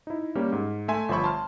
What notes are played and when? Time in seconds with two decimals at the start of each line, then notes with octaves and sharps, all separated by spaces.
0.07 D#4 E4
0.35 G3 A#3 C#4
0.52 G#2
0.88 A3 E5 G#5 C6
1.09 G1 F3 C5 E5 B5 C#6
1.24 A5 C6 F6